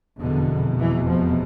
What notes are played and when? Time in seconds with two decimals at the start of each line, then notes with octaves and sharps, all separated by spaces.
0.19 F1 E2 B2 D3
0.78 E3
1.08 F3